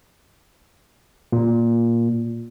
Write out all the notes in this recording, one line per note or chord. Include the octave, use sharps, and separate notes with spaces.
A#2